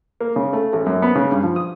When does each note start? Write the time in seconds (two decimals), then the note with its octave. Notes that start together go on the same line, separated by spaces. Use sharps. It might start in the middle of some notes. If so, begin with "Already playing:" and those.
0.21 A#3
0.36 C#3
0.53 A3
0.73 A1
0.86 F#2
1.02 B3
1.16 C#3
1.32 G2
1.43 F3
1.56 D#6